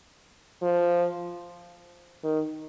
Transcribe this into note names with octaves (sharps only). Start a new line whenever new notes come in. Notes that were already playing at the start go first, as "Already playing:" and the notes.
F3
D#3